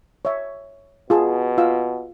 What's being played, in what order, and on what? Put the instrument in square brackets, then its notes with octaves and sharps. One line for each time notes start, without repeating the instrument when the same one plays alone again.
[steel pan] C#5 E5
[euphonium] B2 [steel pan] F4 G#4 A5
[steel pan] F4 F5 E6